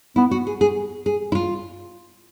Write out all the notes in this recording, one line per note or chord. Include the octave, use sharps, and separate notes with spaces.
B3 E4
F#4
G#4
G#4
G#4
E4
F4